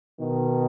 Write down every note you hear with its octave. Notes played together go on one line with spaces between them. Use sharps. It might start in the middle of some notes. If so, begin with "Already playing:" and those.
B2 D#3